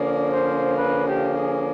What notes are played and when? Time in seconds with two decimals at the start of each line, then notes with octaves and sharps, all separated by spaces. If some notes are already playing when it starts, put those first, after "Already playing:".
Already playing: D3 F3 A#3 C#4 D5
0.32 C5
0.77 B4
1.07 G4
1.38 G#4